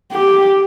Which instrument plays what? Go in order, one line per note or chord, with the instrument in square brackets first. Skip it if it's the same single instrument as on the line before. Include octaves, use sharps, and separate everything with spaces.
[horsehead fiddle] G4